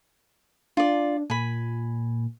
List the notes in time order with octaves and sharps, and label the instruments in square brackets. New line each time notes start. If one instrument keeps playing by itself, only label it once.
[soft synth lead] D4 [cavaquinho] F4 D5
[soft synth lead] A#2 [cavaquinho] G#5 B5